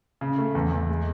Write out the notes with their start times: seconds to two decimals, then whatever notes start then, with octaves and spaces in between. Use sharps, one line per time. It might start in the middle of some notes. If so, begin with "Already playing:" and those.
0.21 C#3
0.38 A3
0.55 E2
0.72 E2
0.89 G#3